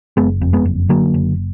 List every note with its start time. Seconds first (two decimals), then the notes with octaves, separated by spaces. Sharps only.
0.17 F#1 G#3 B3
0.41 F2
0.53 G#3 B3
0.65 F#1
0.89 D3 F#3 A#3
1.14 F#1